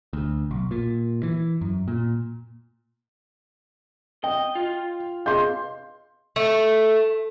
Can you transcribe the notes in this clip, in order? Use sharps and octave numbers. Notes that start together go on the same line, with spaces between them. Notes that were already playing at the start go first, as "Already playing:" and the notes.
D2
B1
A#2
E3
F#2
A#2
D#5 G5
F4
G#4 D#5 F5 C6 G6
A3